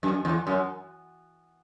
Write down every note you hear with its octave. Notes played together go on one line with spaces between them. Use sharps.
F#2
E2
F#2